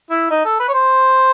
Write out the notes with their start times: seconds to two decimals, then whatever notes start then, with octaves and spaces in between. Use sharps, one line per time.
0.11 E4
0.30 D#4
0.45 A4
0.60 B4
0.68 C#5
0.73 C5